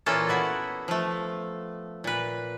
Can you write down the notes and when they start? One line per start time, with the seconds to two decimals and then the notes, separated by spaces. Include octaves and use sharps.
0.06 A#2 E3 A#3 C#4 F4 A4
0.29 B3 E4 F#4
0.88 F3 A3
2.04 A#2 B4